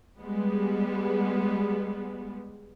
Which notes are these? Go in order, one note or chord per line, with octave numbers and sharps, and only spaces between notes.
G3 G#3 B3